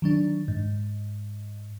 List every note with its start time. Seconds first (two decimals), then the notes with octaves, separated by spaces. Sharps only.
0.02 D#3 F#3 D4
0.48 G#2